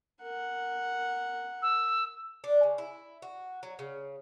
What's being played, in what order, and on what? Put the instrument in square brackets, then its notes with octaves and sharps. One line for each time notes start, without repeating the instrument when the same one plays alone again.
[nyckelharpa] A#4 F#5
[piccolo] E6
[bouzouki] D4
C#3
E4
F#4
F#3
C#3